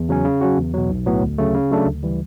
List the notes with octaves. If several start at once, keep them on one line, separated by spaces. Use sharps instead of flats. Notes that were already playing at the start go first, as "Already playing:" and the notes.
Already playing: E2
C#3 F#3 C#4
C#3
F#3 C#4 F#4
E2
B2 F#3
B1
A2 F#3 B3
D2
C#3 F#3 A3
C#3
F#3 A3 D4 A4
D2
C#3 E3 G3